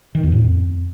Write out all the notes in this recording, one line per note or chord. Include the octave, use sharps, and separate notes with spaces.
D#3
E2
A2
F2